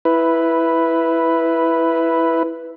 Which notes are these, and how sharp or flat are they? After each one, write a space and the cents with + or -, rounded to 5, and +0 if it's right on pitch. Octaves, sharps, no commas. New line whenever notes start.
E4 +0 B4 +0